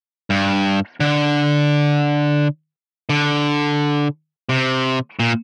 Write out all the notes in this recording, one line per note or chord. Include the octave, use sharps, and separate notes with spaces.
G2
D3
D3
C3
A#2